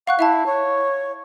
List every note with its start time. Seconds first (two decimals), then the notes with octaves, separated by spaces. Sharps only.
0.07 F5 F#5 C#6 F#6
0.19 E4 E5 F5 A5
0.46 C#5